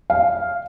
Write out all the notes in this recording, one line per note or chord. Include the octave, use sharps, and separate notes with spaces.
F5